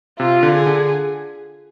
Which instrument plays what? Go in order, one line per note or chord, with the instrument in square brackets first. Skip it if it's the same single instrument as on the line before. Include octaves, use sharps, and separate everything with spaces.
[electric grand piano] C3 [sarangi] F4
[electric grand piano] D3
[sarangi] G#4
[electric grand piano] D3